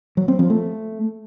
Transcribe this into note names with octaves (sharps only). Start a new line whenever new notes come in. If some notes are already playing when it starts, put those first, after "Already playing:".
F#3
C4
F3
A3